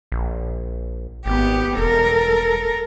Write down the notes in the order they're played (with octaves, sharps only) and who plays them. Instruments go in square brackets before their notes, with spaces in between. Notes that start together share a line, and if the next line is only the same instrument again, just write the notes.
[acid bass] A#1
[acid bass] G#1 [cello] B3 G4
[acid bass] E1 [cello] A4 A#4